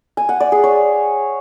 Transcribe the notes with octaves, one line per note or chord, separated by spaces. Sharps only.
G#5
F#5
D5
G#4
C#5